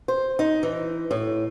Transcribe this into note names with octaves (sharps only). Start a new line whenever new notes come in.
C5
D#4
E3
A2